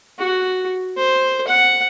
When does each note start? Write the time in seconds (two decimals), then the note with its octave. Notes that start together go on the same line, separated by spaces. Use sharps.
0.18 F#4
0.97 C5
1.47 F#5